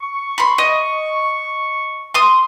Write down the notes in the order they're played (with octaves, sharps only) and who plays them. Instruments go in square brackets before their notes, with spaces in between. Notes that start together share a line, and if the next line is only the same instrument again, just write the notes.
[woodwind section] C#6
[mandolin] B5 C6
D#5
C6 D#6